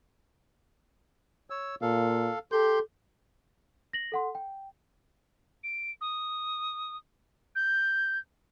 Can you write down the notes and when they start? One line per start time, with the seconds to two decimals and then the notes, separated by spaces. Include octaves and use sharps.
1.50 C#5 E6
1.82 A#2 A4 F5
2.52 G4 A4 C6 G6
3.93 A#6 F#7
4.12 A4 F#5 C6
4.35 G5
5.64 D7
6.01 D#6
7.56 G6